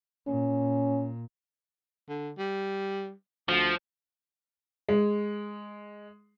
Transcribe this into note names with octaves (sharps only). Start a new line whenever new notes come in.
A#2 C#4
D3
G3
D2 F3
G#3